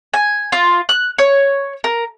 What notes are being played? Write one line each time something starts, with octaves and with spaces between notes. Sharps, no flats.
G#5
F4
F#6
C#5
A#4